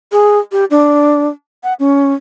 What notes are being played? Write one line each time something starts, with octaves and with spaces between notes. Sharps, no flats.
G#4
G4
D4
F#5
C#4